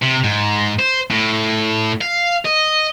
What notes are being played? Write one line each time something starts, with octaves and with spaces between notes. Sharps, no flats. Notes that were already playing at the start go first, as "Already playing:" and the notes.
C3
G#2
C5
A2
F5
D#5